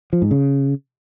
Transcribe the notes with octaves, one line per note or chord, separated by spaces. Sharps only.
F3
G#2
C#3